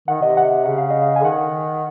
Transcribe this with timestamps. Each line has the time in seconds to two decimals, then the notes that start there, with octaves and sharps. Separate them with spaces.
0.08 D#3 F#5
0.22 C3 D#5
0.37 F#5
0.66 C#3 F#5
0.78 F5
0.90 D#5
1.02 F5
1.16 G#5
1.25 D#3 F#5